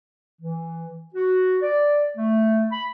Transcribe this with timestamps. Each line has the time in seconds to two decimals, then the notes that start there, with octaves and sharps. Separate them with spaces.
0.41 E3
1.15 F#4
1.62 D5
2.17 A3
2.72 B5